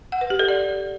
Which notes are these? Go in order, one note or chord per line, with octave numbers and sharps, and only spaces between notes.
F#5
B4
G4
A4
D5